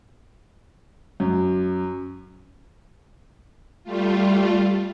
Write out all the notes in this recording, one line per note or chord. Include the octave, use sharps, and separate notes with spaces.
F#2
G3 A3 F4